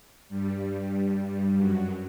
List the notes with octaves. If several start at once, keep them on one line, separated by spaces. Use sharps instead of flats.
G2 G3
G2 G3
F#2 F#3